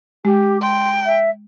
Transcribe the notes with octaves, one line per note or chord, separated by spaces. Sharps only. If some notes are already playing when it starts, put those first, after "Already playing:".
G#3 G4
G5 C6
E5